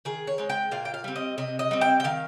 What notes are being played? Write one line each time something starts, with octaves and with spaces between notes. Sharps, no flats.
D#3 G#4
C#5
G#3 C4
G5
A#2 F5
G5
F5
G3 C4
D#5
C3 D#5
D#5
G3 C4
G5
G5
D#3 F5